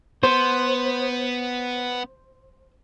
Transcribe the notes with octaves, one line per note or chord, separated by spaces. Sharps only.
B3 C5